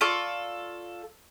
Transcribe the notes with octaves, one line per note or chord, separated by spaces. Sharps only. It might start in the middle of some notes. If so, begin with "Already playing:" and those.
F4 A4 D5 C#6